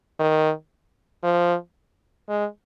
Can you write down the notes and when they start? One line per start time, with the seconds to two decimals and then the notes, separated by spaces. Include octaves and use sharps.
0.19 D#3
1.23 F3
2.29 G#3